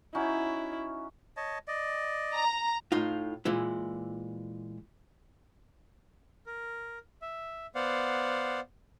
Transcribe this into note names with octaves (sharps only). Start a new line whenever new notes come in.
C#4 D#4 E4 F#4
C#5 D#5 A5
D5 D#5
A#5
A2 D#4 F4
A#2 E3 G#3 E4
A#4
E5
B3 C5 D5 F5 F#5